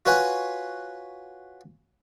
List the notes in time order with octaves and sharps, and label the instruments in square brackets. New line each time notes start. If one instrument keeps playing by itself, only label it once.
[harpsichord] F4 F#4 B4 C#5 F#5 G#5